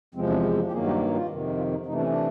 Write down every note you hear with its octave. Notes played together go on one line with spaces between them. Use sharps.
E2 C3 F3 G#3 C4
D4
E4
G4
G2 D#3 F#3 A#3 G#4
G4
F4
F2 C3 D#3
F4
D#4
C3 E3 A3 D#4
D4
C#4
D4